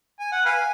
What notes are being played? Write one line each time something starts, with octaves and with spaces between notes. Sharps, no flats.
G#5
F#5
B4 F5 G#5